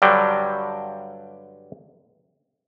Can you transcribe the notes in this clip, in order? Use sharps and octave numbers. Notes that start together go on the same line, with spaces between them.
G2 D3 F#3 G3 G5